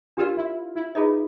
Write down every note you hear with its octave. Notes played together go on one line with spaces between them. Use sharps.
D4 F4 G4 A#4 D5 F5
E4
E4
D#4 F4 G#4 B4 D#5